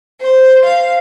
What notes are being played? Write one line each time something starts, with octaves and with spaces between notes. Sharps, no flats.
C5
F5